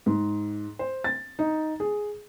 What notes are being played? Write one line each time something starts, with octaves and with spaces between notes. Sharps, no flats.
G#2
C5
A6
D#4
G#4